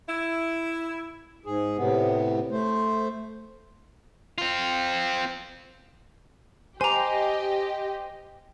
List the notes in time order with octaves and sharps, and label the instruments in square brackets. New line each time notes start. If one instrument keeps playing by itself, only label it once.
[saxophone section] E4
[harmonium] G#2 G#4
A2 C3 B3
A3 C5
[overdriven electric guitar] C4 F4
[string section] G4 D#5 [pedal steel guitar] C5 D6 [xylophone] G#5 A#5